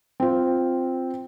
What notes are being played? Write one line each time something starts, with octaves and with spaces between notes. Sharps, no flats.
C4 F4